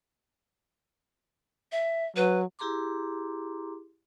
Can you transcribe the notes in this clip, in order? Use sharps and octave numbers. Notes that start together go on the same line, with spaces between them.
E5
F#3 B4
E4 G4 G#4 A#5 C6 D6